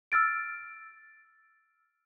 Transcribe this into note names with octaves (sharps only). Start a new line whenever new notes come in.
E6 F6 A6 D7